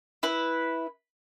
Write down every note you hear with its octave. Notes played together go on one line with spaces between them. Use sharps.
E4 B4